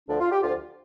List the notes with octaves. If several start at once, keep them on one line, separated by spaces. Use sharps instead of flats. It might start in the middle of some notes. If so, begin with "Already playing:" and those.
D2 D3 F3 D4
F4
G4
D2 D3 F3 F4